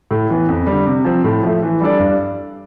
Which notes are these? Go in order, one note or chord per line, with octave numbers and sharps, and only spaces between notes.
A2
E3 B3
F2
D3 G3
C3
F3 C4
A2
F3 A3
E3
G3 D4 A4 D5
G2